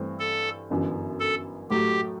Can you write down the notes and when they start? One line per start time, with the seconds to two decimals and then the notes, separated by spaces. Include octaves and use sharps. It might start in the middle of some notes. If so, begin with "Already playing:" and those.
Already playing: G2 E3 A3 C4
0.19 A4
0.70 G1 F#2 E3
1.20 A4
1.70 A2 F#3 A3 G4